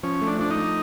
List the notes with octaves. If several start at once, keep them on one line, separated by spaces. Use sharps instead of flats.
F3 C#4
A3
D4
F3 D4
D#4
A3